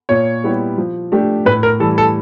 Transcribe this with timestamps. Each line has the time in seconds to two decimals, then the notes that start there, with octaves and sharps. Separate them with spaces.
0.09 A#2 C#5
0.44 G3 B3 E4 G4
0.78 F3
1.12 A3 D4 G4
1.45 A2 B4
1.63 A#4
1.80 E3 G3 A4
1.98 A4